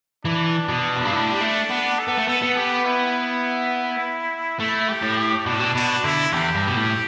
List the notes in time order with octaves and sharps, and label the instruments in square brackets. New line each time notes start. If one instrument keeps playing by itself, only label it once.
[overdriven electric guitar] E3 [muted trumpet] D4
[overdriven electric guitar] B2
E2
G2
A2
G3
A3
B3
[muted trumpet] A4
[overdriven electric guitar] B3
A3
[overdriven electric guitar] B3 [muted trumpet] A4
[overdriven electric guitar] B3
[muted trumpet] G4
E4
[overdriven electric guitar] A3 [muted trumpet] E4
[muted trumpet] G4
[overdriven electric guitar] A2
[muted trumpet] G4
[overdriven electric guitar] B2 [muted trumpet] D4
[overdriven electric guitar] A2
B2
[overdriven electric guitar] B2 [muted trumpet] D4
[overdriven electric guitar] D3 [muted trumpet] E4
[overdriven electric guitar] E2 [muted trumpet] G4
[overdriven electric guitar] G2
B2
A2